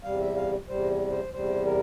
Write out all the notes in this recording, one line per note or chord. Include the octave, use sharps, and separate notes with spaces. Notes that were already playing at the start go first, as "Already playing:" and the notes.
E2 C3 G3 F5
E5
F5
E2 C3 G3 C5
C5
E2 C3 G3 C5
A#4